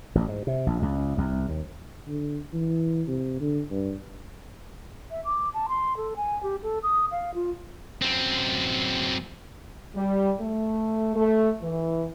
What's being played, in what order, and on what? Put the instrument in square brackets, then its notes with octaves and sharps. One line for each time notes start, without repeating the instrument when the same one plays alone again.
[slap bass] A1
G#2
C3
A#1
C#2
C2
D#2
[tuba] D3
E3
C3
D3
G2
[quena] E5
D6
A5
C6
A4
G#5
G4
A4
D#6
F5
F4
[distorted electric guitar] F#2 C4
[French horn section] G3
A3
A3
E3